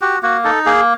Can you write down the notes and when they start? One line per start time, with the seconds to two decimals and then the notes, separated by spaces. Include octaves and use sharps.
0.01 F#4 G4
0.23 A#3 F#4
0.44 D#4 A4
0.66 A#3 G#4